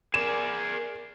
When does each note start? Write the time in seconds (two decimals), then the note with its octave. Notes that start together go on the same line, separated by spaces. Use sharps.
0.14 G#4 A#4 D5 E7